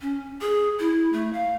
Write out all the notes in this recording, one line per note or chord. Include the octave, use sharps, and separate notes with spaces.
C#4
G#4
E4
A3
F5